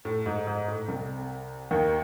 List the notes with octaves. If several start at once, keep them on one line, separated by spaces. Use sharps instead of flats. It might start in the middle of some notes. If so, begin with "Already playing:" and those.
A2
G#2
G#2
A2
C2 C3
D#2 D#3